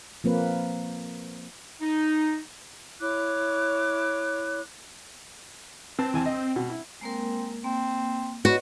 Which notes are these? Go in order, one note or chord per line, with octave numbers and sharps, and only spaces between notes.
F3 A#3 C4 B4
D#4
E4 C#5 D6 F#6
C4 B4 A5
E2 G#5 A5
D#5
B2
E4
G#3 A#3 C4 A#4
A#3 C4
B3 F#4 B4 C#5 D#5